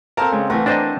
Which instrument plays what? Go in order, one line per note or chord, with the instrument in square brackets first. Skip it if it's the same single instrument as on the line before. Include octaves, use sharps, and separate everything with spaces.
[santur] A#3 C4 A4 [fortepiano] A#4 A5 A#5
[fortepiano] C#3 G#3
[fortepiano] E3 A3 [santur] A#4 F#5 C#6
[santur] C4 D5 A5 [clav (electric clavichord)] D4 C5 D#5